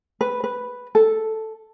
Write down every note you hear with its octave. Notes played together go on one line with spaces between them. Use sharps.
B4
B4
A4